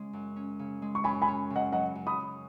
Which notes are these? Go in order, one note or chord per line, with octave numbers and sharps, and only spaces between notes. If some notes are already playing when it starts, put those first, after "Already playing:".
Already playing: C#3 G#3 C#4
F#2
C#4
C#3
G#3
C#6
F#2 G#5 B5
G#5 B5
C#4
C#3
D#5 F#5
F#3 D#5 F#5
F#2
B5 D#6
F#2